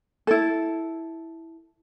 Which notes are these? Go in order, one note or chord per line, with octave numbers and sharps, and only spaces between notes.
E4 A4